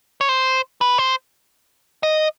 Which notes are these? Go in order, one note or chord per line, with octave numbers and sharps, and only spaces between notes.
C#5
C5
B4
C5
D#5